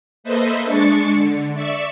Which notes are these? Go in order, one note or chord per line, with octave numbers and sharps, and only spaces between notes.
A#3 A4 B4 C5 D#5 E5
G#3 D4 C#6 A6 C#7
D3
D5 E5 C#6 E6